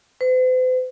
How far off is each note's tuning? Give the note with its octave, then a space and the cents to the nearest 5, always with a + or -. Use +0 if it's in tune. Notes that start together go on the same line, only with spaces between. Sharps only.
C5 -45